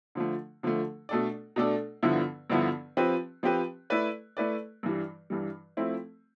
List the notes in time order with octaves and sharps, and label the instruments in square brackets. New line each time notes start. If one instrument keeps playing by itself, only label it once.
[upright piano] D3 F3 A3
D3 F3 A3
B2 A3 D4 A4 D5
B2 A3 D4 A4 D5
G2 D3 F3 B3 E4
G2 D3 F3 B3 E4
F3 C4 G4 B4
F3 C4 G4 B4
A3 E4 B4 D5
A3 E4 B4 D5
G2 E3 G3
G2 E3 G3
F3 A3 C4 E4